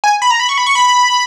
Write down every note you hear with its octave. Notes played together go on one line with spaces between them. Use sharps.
G#5
B5
A#5
B5
C#6
B5
C#6
B5